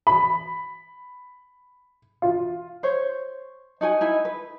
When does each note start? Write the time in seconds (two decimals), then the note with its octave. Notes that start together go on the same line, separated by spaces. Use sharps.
0.07 B5
2.22 F4
2.83 C5 C#5
3.81 D#4 F#4 G#5
4.01 D#4 E4 G#5
4.25 B4